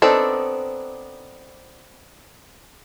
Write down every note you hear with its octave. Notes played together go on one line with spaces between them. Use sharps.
B3 C4 D4 D#4 A4